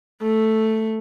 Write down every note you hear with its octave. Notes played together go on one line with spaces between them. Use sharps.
A3